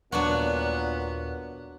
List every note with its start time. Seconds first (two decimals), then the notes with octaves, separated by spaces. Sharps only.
0.12 D#1 A#2 F#3 B3 D4 F#4